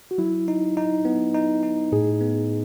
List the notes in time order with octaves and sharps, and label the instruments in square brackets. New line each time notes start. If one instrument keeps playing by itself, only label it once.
[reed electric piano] F#4
[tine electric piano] F#3 [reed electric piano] E4
[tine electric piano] D#4
D#4
B3
D#4
D#4
[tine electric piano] A2 [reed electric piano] G#4
[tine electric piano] B3